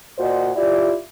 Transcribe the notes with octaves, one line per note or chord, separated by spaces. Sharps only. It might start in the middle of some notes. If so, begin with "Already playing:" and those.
A#2 F#4 C5 D5 D#5
E4 F4 G4 D5